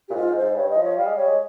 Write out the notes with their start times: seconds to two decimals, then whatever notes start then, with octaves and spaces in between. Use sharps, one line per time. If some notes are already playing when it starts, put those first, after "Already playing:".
0.09 A#2 G4
0.15 G#2 F4
0.30 G#2
0.36 C5
0.42 G#2
0.56 G2 C#5
0.70 D#5
0.77 F3
0.84 C#5
0.97 G3 F5
1.07 G#3
1.17 G3 C#5
1.28 G#3